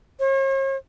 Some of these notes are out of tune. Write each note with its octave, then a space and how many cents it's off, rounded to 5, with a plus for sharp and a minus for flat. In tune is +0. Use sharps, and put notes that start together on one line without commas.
C#5 -45